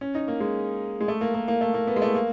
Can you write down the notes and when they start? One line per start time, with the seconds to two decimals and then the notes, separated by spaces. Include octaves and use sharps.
0.01 C#4
0.15 D#4
0.28 A#3
0.40 G#3
1.01 G#3
1.08 A3
1.21 A#3
1.34 A#3
1.48 A#3
1.61 A3
1.74 A#3
1.87 B3
1.96 G#3
2.02 A3
2.15 A#3